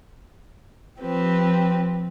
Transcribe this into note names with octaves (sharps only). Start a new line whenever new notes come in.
F3 C4 G4 B4